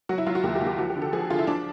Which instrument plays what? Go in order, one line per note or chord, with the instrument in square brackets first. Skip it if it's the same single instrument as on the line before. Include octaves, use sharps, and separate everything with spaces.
[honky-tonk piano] F#3 F#4
E4
F#3 F4
F#4
D#2 G4
G4
D#2
G4
F3 F#4
G4
D3
A4
F3 G#4
D3 F4
E4
F3 D4